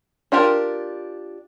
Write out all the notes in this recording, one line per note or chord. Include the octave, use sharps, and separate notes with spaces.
D4 F4 G4 A#4